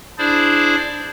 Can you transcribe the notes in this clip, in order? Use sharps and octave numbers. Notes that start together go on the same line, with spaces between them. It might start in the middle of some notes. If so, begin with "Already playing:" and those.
D4 E4 G#4 C5 D5